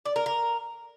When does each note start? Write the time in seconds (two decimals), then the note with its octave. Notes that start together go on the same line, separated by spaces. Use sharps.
0.05 D5
0.16 A#4
0.26 A#4